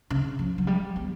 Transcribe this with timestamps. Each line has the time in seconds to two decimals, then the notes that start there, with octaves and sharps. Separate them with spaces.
0.10 C#3
0.39 F3
0.58 F#3
0.67 G3
0.96 B3